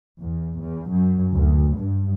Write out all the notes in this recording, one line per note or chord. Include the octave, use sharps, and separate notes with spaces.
E2
E2
F#2
D2
G2